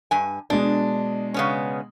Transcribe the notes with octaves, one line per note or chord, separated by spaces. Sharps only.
G2 G#5
B2 G#3 D4
C#3 B3 C#4